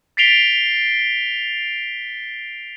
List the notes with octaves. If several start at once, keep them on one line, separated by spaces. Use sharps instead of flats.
A6 B6 C7 D7 F7 G7